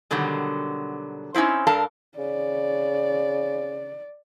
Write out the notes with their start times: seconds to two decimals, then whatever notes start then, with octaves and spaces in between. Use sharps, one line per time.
0.11 B2 D3 D#3 F#3 G3
1.34 C4 C#4 D#4 E4 C5
1.67 G2 D4 A4 A#4 F5 A5
2.18 C#3 D5